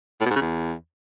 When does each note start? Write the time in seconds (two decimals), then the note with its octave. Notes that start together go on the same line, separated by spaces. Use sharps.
0.21 A2
0.26 B2
0.31 G#2
0.36 C#3
0.41 E2